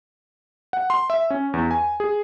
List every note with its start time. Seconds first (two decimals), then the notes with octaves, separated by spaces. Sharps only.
0.73 F#5
0.90 C6
1.10 E5
1.30 C#4
1.53 E2
1.71 G#5
2.00 G#4